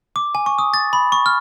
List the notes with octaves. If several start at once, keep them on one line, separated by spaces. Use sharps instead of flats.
D6
G#5
C#6
D#6
A6
B5
C#6
F6